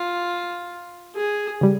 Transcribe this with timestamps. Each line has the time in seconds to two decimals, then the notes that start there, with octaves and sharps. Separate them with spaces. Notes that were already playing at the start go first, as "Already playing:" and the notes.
Already playing: F4
1.15 G#4
1.61 C#3 G3